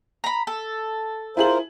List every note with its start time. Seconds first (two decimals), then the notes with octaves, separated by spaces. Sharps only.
0.24 A#5 B5
0.47 A4
1.37 E4 F4 G#4 A#4 C5 F#7